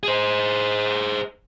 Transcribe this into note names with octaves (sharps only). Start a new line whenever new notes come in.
G#4 C5